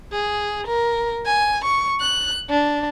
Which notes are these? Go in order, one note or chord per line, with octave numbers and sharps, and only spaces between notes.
G#4
A#4
G#5
C#6
F#6
D4